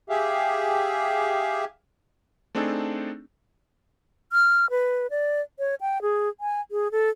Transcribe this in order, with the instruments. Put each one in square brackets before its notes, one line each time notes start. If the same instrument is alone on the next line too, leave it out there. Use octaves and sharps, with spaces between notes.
[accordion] G4 G#4 E5 F5
[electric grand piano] A3 C4 D4 D#4 G#4 A4
[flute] F6
B4
D5
C#5
G5
G#4
G#5
G#4
A4